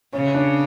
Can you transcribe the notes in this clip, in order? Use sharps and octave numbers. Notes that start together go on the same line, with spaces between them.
C#3 C#4
D4